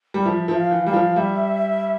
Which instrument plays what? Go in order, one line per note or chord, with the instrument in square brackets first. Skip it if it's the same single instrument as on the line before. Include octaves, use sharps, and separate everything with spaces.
[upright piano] G3
[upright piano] F3 [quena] E5
[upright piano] F3
[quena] F5
[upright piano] E3
[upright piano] G3 [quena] F5
[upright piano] F3
[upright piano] G3 [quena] E5